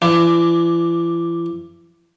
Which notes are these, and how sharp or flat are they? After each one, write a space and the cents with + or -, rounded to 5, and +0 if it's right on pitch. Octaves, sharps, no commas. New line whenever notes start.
E3 +40 D4 +0